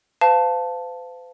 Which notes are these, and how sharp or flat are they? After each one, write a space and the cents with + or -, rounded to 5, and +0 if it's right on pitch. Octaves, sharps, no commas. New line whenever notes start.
C5 -45 F5 +0 A5 +0